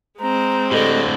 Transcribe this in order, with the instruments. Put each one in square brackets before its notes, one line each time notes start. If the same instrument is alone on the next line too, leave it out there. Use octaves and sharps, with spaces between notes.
[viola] G#3 C4 [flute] A#5
[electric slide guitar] A2 D3 [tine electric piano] G4 A4 [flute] D#5